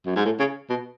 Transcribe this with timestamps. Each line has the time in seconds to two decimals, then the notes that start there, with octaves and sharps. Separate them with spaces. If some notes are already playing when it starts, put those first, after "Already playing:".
0.06 F#2
0.16 G#2
0.25 A2
0.39 C#3
0.70 B2